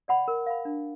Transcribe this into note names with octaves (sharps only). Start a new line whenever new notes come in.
D5 F#5 B5
A#4
F5 B5
D4